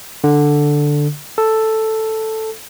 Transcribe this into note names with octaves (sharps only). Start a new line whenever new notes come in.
D3
A4